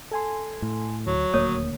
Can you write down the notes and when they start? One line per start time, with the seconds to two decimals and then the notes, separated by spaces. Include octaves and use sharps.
0.11 A4 G#5 C6
0.62 A2
1.07 D2 F#3
1.34 D#1 D2 A#3 C#5 D#6